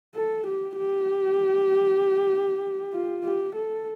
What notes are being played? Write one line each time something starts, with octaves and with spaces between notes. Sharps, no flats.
A4
G4
G4
F4
G4
A4